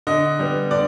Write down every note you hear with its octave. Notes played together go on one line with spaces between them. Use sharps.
D3 D#5
G3 B3
D3 D5